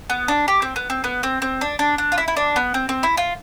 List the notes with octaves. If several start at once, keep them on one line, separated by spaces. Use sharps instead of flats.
B3
D4
G4
C4
B3
C4
B3
C4
C4
D4
D4
D4
F4
E4
E4
D4
B3
C4
C4
E4
F4